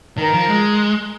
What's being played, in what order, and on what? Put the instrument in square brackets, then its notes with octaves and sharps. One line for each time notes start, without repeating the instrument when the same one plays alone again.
[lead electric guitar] D#3 [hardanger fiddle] A#4
[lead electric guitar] F3
G#3